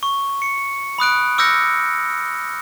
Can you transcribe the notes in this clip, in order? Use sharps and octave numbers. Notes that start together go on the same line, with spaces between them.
C#6
C#7
B5 D#6 F#6 D7
D6 E6 F6 G6 A#6 C#7